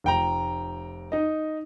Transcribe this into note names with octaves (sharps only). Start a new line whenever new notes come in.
F1 G5 A#5
D#4 D#5